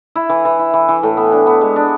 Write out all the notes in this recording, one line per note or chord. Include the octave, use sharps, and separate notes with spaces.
E4
E3
E3
E4
E3
E3
A2
B3
D4
B3
G#3
D4